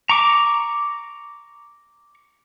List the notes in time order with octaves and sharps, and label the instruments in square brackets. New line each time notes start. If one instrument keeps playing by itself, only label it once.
[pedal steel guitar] A#5 C#6 D6